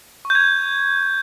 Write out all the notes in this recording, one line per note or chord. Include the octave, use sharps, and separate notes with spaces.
C#6
G6
G#6